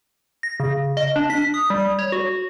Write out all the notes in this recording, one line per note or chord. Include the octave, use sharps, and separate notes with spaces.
A#6
C#3
D#5
D4
B6
D#6
G3
C#5
F#4